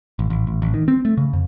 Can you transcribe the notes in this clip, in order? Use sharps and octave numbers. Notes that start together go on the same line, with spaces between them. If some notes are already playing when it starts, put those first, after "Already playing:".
A1
A1
A1
A1
D#3
C4
A3
C#3
F2